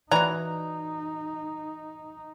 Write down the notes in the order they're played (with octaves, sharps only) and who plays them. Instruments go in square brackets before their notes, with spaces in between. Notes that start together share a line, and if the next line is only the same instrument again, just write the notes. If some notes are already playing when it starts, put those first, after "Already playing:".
[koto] E3 F#4 [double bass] D#4 [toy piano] D5 [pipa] A#5